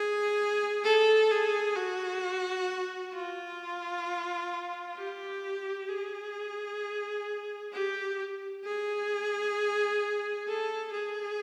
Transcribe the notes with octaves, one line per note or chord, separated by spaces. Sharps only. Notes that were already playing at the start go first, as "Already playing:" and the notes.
Already playing: G#4
A4
G#4
F#4
F4
G4
G#4
G4
G#4
A4
G#4